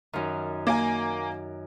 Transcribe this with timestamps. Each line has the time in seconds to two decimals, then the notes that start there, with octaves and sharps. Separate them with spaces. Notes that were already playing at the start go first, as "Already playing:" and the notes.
0.13 F#2 D#3
0.67 A#3 A#4 G#5